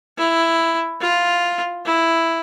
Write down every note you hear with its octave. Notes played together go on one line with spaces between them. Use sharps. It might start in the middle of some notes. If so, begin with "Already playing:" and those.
E4
F4
E4